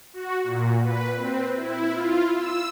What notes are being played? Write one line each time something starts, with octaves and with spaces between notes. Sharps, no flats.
F#4
A#2
B4
C4
E4
F4
E6